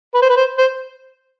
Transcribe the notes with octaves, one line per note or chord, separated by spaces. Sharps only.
B4
C5
B4
C5
C5